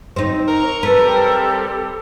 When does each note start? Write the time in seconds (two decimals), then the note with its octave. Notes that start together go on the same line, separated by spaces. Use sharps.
0.16 C4 D#4
0.48 A#4 A#5 C#6
0.83 G3 C4 G4 A4 B4